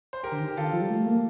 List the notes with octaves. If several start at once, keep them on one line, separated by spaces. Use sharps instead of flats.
C5
G4 A#4
D3
D#3
G4
D3 F4 A4
D#3
F3
G3
A3
A#3